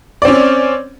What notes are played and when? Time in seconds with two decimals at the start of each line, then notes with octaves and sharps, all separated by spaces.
0.22 D5
0.25 C4
0.28 C#4